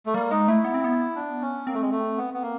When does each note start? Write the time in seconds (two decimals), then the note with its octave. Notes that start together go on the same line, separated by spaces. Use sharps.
0.06 A3
0.14 G3 A#3
0.31 G#3 D#4
0.48 A3 E4
0.64 B3
0.74 C4
0.84 B3
1.16 D4
1.41 C#4
1.67 A#3 C4
1.74 A3
1.82 G#3
1.91 A3
2.17 B3
2.34 B3
2.42 A#3